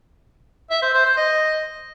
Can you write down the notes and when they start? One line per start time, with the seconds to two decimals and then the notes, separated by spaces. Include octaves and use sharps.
0.70 E5
0.82 C5
0.94 C5
1.05 C5
1.17 D#5